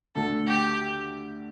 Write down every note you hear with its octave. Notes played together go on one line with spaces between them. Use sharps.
D2 D3 A3 A4
G4